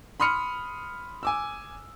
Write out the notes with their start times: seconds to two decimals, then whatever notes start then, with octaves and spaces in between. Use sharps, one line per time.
0.20 B5 C6 D#6 F6 C#7
1.23 G#5 D6 E6